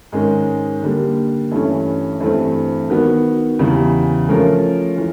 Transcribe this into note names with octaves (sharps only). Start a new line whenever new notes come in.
G#2 D#3 G#3 C#4
D3 G3 A#3
G2 E3 A3 C#4
G2 E3 A3 C4
D#3 F#3 B3
E2 C#3 E3 G3
F3 A3 C#4 F4 A#4
E3